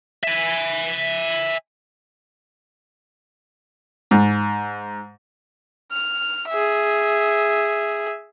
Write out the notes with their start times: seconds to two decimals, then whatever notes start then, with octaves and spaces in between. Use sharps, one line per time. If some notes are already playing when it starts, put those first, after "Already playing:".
0.23 E5 G#5
4.11 G#2
5.92 F6
6.49 G#4 E5